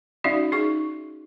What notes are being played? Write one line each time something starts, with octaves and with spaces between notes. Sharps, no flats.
C#4 D#4 F#4 D5 E5 F5
D#4 G#4 C#6